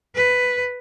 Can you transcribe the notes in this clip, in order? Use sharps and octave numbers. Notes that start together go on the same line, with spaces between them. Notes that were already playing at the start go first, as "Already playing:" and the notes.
B4